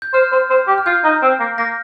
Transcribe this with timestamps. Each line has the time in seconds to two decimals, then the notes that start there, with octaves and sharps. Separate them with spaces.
0.02 G6
0.13 C5 F6
0.32 C5
0.50 C5
0.67 G4
0.78 F6
0.86 F4 G6
1.04 D#4
1.22 C4
1.40 A#3
1.58 A#3 A#6